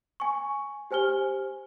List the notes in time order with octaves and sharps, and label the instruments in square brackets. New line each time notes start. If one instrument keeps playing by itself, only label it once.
[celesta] G#5 C#6
G4 C5 G#5 F6 G7